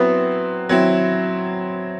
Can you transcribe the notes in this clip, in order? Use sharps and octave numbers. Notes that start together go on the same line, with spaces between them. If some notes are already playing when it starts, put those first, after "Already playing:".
Already playing: F#3 B3 C4 E4
F#3 C4 E4